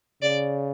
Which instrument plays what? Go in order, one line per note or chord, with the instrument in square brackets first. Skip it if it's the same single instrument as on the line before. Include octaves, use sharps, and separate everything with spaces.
[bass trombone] C#3 [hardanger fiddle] D5